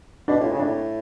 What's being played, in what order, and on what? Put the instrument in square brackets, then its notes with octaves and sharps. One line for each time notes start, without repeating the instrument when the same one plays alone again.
[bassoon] B2 [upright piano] D4
[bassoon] A2 [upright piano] F4
[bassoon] C#3
[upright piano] D4
[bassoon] A2